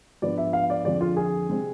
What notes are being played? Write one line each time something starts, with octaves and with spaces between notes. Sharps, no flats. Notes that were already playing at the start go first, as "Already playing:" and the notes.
G#2 F3 B3 D4 D5
E5
F5
D5
F2 D3 G#3 D5
F4
G#4
C3 G#3 C4